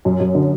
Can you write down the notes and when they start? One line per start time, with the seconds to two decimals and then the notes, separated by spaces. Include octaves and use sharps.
0.05 F#2
0.20 F#2
0.35 D3